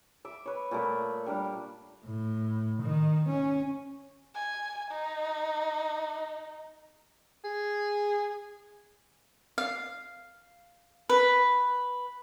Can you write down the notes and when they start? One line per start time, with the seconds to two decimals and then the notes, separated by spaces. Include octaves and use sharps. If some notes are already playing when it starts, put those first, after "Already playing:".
0.25 E5 D6
0.46 B4 C#5
0.71 A#2 A3 A#4 B5
1.26 G3 D4 A#4
2.06 A2
2.82 D#3
3.29 C#4
4.35 G#5
4.91 D#4
7.44 G#4
9.58 F5
11.09 B4